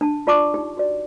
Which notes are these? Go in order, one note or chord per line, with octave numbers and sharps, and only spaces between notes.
D4 A5
F4 D5 A5 C#6 D6
D#4 G4
F#4 D5